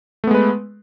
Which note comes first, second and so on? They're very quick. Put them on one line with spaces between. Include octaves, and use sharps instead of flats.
A3 B3 G#3 B4